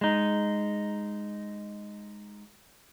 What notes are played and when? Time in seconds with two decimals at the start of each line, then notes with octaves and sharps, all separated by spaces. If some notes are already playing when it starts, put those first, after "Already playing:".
0.01 G#3 D#4